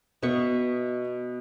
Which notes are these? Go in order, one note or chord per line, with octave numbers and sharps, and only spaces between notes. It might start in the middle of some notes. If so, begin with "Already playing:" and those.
B2 B3 E5 C#6